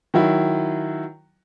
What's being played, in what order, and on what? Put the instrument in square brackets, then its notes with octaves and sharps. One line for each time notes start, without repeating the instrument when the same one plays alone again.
[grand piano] D#3 F#3 E4